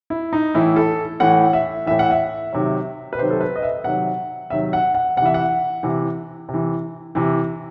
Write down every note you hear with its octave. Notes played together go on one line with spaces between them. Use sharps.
E4
D#4
A2 E3 E4
A4
A2 E3 F#5
E5
A2 E3 E5
F#5
E5
C3 D#3 F#3
B4
C3 D#3 F#3 C5
A4
B4
D#5
E5
C3 D#3 F#3 F#5
C3 D#3 F#3 E5
F#5
F#5
C3 F#5
E3 E5
F#5
C3 E3
C3 E3
C3 E3